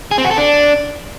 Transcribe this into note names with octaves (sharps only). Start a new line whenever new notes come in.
G#4
C4
F#4
A4
D4